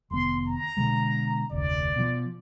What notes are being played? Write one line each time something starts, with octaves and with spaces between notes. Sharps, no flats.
F1 D#3 B3 C6
A#5
B2 D3 G#3
F1 D2 D5
B2 F3